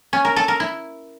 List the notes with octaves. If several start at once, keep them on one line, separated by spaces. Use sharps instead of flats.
C#4
A#4
A4
A#4
E4